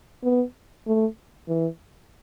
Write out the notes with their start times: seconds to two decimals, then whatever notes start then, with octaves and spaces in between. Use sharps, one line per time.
0.24 B3
0.87 A3
1.48 E3